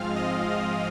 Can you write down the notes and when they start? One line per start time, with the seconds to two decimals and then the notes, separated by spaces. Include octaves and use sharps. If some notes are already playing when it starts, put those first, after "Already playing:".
Already playing: G#2 F3 G#3 C4 F4 F5 F6
0.16 D#5 D#6